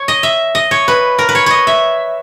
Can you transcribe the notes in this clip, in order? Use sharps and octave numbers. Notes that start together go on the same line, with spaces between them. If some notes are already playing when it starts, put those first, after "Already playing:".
Already playing: C#5
D#5
E5
D#5
C#5
B4
A#4
B4
C#5
C#5 D#5
E5